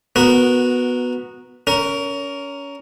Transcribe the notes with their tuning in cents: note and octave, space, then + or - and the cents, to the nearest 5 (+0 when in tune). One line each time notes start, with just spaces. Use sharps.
B3 +0 F#4 -15 A#4 +0
C#4 +25 A#4 +0